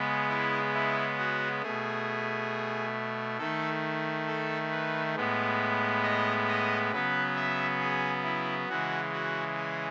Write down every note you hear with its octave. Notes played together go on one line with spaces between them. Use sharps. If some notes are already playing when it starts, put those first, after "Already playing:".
Already playing: C#3 G#3 B3
E4
E4
F#4
B2 A3 G#4
D#3 A3 A4
A4
B4
A2 G#3 B3
D#5
D#5
C#3 F#3 B3 B4
E5
G#4
E4
C#3 E3 G#3 F#4
F#4
G#4